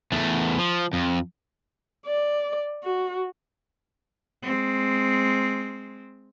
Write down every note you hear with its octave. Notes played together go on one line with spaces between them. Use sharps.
E2 A3
F3
F2
D5
F#4
G#3 C4